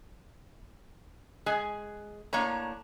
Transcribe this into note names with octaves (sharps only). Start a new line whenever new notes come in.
G#3 G#4 G#5
A2 A#3 D4 C#5 A#5